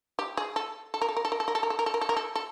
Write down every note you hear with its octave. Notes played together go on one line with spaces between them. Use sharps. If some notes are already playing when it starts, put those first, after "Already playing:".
G4
G#4
A4
A4
A#4
A4
A#4
A4
A#4
A4
A#4
A4
A#4
A4
A#4
A4
A#4
A4
A#4
A4
A4